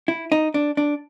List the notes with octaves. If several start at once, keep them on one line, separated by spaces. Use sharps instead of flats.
E4
D#4
D4
D4